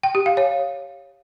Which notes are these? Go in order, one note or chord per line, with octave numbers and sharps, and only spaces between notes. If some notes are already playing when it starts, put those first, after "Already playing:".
G5
G4
F5
C#5